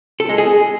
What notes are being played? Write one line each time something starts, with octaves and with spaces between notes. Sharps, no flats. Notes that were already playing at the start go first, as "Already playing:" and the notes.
A4
G#3
G#4